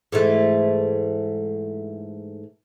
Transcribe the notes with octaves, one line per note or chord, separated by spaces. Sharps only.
G#2 E3 A3